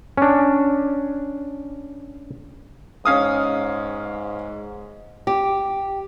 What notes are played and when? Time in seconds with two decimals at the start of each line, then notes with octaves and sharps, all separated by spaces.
0.17 C#4 D4
3.05 G#2 C#4 F5 D#6
5.27 G4